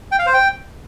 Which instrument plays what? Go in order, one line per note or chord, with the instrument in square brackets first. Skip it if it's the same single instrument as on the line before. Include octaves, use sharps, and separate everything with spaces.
[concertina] G5
F5
C5
G5